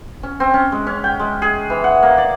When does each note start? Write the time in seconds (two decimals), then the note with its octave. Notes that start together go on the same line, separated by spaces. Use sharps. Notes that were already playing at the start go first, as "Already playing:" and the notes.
0.23 C#4
0.40 C4
0.54 C#4
0.72 G#3
0.87 C#4
1.04 G5
1.20 G#3
1.42 G#4
1.70 E3
1.84 F#5
2.03 A#3
2.18 D5